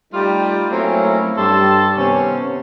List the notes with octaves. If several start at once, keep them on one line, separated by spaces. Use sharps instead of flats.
G3 A3 D#4 F4 G4
F#3 A3 A#3 C4 C#4 E4
G2 G3 G4 A4 A5 C6
C3 D#3 B3 C#4